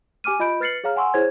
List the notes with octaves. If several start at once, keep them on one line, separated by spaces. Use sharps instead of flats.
G4 G#5 D6 F6 D#7
F4 D#5 B5 G6 D7
B4 F6 A6 C7 C#7 F#7
G#4 C#5 F5 A#5 F6
F#5 G#5 C6 C#6 E6
E4 G#4 C5 C#5 G#6